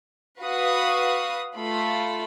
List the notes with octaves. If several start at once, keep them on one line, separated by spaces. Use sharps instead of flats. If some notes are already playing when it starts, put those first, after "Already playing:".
F#4 B4 F5 D#6
A3 F4 B5